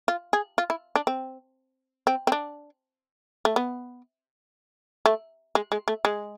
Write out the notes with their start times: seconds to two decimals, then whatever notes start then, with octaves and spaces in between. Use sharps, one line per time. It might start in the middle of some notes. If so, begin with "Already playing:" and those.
0.08 F4
0.33 G#4
0.58 F4
0.70 E4
0.96 D4
1.07 C4
2.07 C4
2.27 C4
2.32 D4
3.45 A3
3.56 B3
5.06 A3
5.55 G#3
5.72 G#3
5.88 A3
6.05 G#3